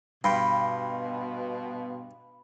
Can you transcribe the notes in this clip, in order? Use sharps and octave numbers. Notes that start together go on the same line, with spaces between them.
G2 B2 F5 G5 B5 C6